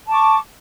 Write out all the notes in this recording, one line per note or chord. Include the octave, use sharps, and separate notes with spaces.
A5 C#6 D6